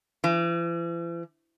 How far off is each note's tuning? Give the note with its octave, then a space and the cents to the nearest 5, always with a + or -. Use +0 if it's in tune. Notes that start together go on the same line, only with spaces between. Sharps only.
E3 +45